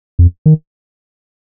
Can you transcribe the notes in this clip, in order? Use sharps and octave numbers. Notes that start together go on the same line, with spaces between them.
F2
D#3